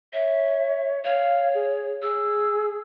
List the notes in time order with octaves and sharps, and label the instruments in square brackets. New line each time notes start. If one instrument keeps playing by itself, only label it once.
[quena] C#5 [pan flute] E5
[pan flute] C#5 [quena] F5
[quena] G#4
[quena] G#4 [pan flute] E6